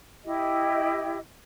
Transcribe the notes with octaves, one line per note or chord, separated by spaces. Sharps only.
E4 G4 D#5